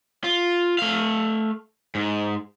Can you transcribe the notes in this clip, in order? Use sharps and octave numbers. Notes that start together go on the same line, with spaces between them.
F4
A3 F5
G#2